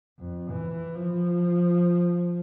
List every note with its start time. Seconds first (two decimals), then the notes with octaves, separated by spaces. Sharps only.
0.20 F2
0.50 E3
0.96 F3